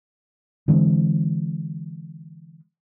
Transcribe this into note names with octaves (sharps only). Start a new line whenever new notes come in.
D3 E3 G#3 C4